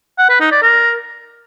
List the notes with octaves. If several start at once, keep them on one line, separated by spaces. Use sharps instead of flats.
F#5
B4
D#4
D5
A#4